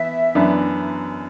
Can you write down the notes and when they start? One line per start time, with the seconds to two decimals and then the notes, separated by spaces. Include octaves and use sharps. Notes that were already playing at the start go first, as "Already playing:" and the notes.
Already playing: E3 B3 E5
0.35 F#2 E3 B3 D4